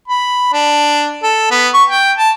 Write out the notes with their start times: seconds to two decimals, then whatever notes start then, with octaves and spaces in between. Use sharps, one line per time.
0.08 B5
0.53 D4
1.23 A4
1.51 B3
1.74 C#6
1.90 G5
2.18 A5